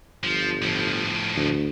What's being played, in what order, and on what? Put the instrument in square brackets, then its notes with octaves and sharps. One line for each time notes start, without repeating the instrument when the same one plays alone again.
[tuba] G1 [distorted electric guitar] F3
[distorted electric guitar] A2 F3
[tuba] D2